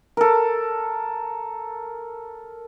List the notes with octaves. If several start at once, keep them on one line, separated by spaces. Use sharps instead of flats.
A4 A#4